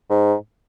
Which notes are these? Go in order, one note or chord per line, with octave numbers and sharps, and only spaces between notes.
G#2